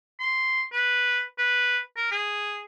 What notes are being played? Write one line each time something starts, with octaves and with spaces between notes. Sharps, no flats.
C6
B4
B4
A#4
G#4